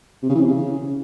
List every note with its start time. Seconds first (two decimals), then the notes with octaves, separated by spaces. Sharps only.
0.23 C3
0.29 C#3
0.35 E3
0.41 C3
0.47 C#3